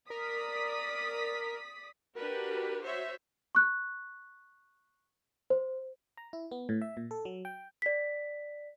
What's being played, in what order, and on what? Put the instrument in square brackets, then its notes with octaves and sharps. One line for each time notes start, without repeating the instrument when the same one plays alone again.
[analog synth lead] A#4 [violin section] D5 D#6 B6
[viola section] D4 F#4 G4 A#4 B4
F#4 C5 C#5 E5
[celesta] C#6 F#6
C5
[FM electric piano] A#5
E4
B3
A2
E5
A#2
A4
F#3
G5
[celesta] D5 B6